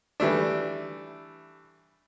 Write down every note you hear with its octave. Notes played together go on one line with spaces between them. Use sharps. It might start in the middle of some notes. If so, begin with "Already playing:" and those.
E3 G3 A3 D4